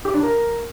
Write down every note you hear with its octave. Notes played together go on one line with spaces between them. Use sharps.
G4
D4
A#4